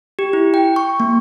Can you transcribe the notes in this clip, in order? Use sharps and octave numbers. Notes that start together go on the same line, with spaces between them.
G4
E4
G5
C#6
A#3